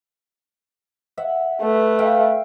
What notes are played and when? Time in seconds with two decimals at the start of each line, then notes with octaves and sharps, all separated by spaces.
1.17 E5 F#5
1.62 A3 B4
1.99 E5 F5 G5